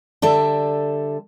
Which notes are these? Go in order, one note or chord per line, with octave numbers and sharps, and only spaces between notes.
D3 G3 A4 E5